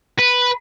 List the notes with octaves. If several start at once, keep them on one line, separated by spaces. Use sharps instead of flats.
B4